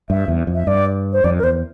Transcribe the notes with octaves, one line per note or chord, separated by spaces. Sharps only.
G2 E5
E2
F2
E5
G2 D5
C5
F2 D5
A#4
E2 C5